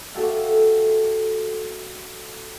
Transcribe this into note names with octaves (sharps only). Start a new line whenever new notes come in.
F#4 G4 A4 E5 F5